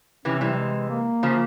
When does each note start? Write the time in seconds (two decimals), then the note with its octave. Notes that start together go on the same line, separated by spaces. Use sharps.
0.25 C3 E3 C#4
0.41 C3 E3 G3
0.53 G3
0.58 G#3
0.90 A#3
1.23 C#3 F3